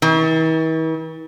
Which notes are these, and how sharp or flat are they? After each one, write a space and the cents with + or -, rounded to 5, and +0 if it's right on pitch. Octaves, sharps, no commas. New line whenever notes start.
E3 -45